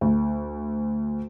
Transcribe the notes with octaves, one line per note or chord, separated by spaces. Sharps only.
D2